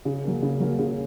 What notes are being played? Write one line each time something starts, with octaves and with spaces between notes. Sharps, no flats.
C#3
F#3 A#3
C#3
F#3 A#3
C#3